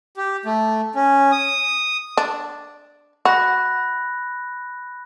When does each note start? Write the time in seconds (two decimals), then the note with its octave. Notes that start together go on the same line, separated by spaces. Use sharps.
0.17 G4
0.46 A3
0.95 C#4
1.32 D#6
2.17 D4
3.25 F#4 B5 F#6 A#6